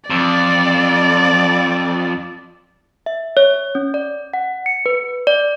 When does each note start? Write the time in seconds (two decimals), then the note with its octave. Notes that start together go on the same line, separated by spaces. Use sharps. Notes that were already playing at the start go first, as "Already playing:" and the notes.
0.10 F2 D5
3.06 E5
3.37 C#5
3.75 C#4
3.94 D5
4.34 F#5
4.66 C#7
4.86 B4
5.27 D5